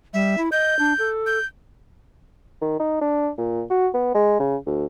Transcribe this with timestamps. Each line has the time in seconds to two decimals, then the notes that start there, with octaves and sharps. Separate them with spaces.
0.13 G3 E5
0.37 E4
0.52 D#5 G6
0.79 D4
0.99 A4
1.26 G6
2.62 D#3
2.80 D#4
3.01 D4
3.38 A#2
3.70 F#4
3.94 B3
4.15 G#3
4.40 C#3
4.66 D2